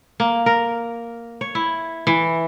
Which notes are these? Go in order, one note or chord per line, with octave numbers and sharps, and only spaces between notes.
A#3
A#4
C#5
E4
E3